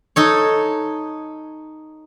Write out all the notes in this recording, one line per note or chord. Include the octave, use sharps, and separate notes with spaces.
D#4 A4 C#5